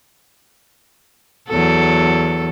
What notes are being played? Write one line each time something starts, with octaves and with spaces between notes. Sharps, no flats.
E2 F#3 A4